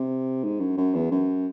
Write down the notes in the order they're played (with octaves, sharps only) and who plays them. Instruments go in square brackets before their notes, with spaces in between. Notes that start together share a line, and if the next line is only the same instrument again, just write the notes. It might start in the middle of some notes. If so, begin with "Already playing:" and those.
Already playing: [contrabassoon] C3
G#2
F#2
F#2
E2
F#2